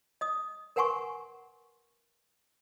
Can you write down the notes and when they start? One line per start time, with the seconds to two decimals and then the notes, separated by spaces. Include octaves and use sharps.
0.21 D#5 D#6
0.76 A#4 B4 F#5 G#5 C6 C#6